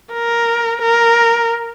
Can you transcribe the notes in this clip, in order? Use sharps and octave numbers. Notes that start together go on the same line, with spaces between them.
A#4
A#4